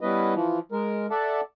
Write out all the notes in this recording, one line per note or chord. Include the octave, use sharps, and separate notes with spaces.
G3 B3 C#4 E4 B4 D#5
E3 F3
G#3 A#4
A4 D5 E5 F#5 A5